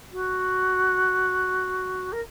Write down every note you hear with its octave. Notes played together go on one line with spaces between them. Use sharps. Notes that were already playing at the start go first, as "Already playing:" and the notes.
F#4
A#4